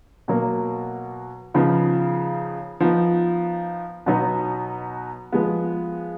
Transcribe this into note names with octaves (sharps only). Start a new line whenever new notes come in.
B2 F#3 A#3
C#3 F3 B3 D#4
F3 B3 D#4
B2 F#3 B3 D#4
F3 G#3 B3